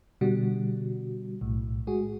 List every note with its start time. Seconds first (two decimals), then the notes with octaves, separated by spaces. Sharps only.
0.21 B2 D3 G3 F#4
1.41 B1 A2
1.87 G#3 F#4 G#4